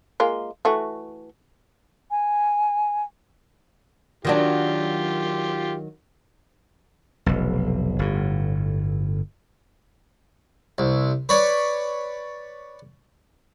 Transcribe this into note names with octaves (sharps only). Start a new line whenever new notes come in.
G#3 A#3 F4
E3 A3 F#4
G#5
D#3 F#3 D4 F4 G4
F1 B1
G1 A2
C2
B4 C#5 D5